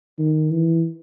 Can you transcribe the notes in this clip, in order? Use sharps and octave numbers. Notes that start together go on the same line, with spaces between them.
D#3
E3